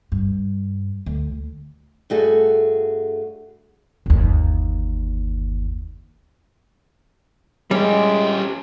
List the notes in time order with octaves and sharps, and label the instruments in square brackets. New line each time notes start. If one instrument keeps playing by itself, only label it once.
[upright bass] G2
D2
[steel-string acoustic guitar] G2 A3 F#4 G#4
[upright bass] G1 D#2
[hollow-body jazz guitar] G3 [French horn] G#3 [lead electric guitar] C#4 G4